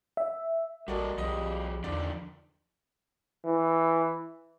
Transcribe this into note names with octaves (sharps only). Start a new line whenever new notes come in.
E5
A1 G3 F#4 A4 A#4 D5 D#5
B1 F3 G3 C4 G4 G#4 D#5
E2 D3 D#3 F3 D5
E3